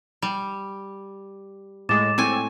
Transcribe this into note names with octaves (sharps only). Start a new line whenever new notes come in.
G3
A2 G#3 D6 A6 E7
A2 C4 G#5